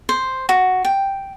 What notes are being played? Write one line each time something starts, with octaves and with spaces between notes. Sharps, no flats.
C5
F#4
G5